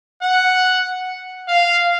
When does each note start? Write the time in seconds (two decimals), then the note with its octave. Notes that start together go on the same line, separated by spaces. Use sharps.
0.22 F#5
1.48 F5